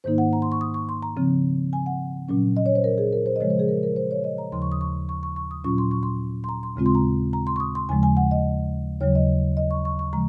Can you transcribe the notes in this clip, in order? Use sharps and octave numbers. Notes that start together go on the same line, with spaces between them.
G#2 D#3 A#3 D#4 C5
F#5
A#5
C6
C#6
D#6
C#6
C6
A#5
C#3 F3 C4
G#5
F#5
A#2 F#3 C#4
D#5
C#5
C5
A#4
G#4
A#4
C5
D#5
C#3 F3 G#3 C#5
C5
G#4
A#4
A#4
C5
C#5
D#5
A#5
D#2 C#3 F3 C6
C#6
D#6
C#6
C#6
C#6
C#6
D#6
A#2 F#3 C#4 F4 C#6
C6
C#6
C6
C6
A#5
C6
D#2 C#3 G#3 C4 F4
C6
A#5
A#5
C6
C#6
D#6
C6
D#2 C#3 F3 G#3 G#5
G#5
F#5
D#5
D#2 C#3 F#3 C#5
D#5
D#5
C#6
C#6
C#6
C#3 F3 G#3 A#5